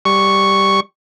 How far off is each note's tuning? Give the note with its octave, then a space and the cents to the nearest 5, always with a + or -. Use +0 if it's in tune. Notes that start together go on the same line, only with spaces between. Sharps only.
G3 +0 C#6 +0